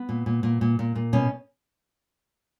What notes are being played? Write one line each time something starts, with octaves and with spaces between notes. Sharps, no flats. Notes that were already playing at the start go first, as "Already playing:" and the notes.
Already playing: B3
A#2
A#2
A#2
A#2
A#2
A#2
B2 C#4